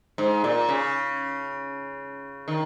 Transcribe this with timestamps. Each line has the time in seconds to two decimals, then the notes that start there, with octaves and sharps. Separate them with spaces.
0.18 G#2
0.44 A#2
0.69 C#3
2.48 D#3